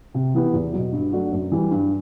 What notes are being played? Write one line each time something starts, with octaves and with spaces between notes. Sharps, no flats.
C3
E3 B3 E4 G4
E2
B2 F#3
G2
F#3 A3 D4 F#4
F#2
E3 G3
G2